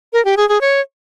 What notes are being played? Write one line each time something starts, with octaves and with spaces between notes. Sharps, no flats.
A#4
G4
G#4
G#4
C#5